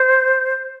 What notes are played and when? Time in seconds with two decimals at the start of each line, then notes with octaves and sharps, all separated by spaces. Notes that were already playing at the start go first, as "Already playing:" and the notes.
Already playing: C5